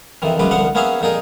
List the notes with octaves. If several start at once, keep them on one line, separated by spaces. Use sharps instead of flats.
F2 C3 D#3 E3
B1 F#2 C#3 G#3 B4 D6
C2 D3 F3 B3 F5 F#5
A#3 B3 C#4 G#4 E5 F5
F2 A#2 D#4 G#4 A#4